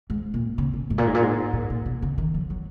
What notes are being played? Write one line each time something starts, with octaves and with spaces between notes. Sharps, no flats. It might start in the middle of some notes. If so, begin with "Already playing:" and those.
G#2
A#2
C#3
A#2
G#2
A#2
G#2
A#2
G#2
A#2
A#2
B2
C#3
D#3
F3
F#3